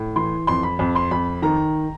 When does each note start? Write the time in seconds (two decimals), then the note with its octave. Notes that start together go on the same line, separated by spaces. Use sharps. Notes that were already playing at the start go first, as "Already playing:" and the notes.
Already playing: A2
0.16 E3 C6
0.47 F2 C6
0.63 B5
0.79 F2 B5
0.95 C6
1.11 F2 B5
1.42 D#3 A#5